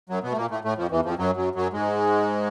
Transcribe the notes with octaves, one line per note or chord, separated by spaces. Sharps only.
F#2 F#3
B2 B3
A3
A#2 A#3
A2 A3
A2 A3
F2 F3
E2 E3
F2 F3
F#2 F#3
F#2 F#3
F#2 F#3
G#2 G#3